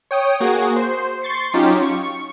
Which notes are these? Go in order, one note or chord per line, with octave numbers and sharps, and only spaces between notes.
C#5 G5 D#6
A#3 F#4 G#4
C5
C6 C#6 A6 C7 C#7
F#3 C#4 D#4 F4 G4
C#6